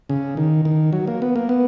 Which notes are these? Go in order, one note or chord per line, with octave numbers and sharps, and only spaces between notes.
C#3
D#3
D#3
F#3
A#3
B3
A#3
B3